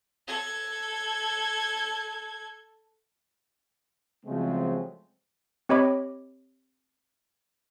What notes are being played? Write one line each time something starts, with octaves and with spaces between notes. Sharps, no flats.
A4 G#6
C#3 F3 F#3 G#3 A3 C4
C4 G4 C#5 D#5 B5 D6